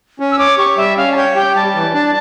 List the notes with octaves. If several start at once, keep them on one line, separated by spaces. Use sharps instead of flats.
C#4
E6
C#5 D6
G4 C#6
G3 E5
C#4 F5
A5
C#5 G5
F5
G4 G5
G3 A5
E3
D4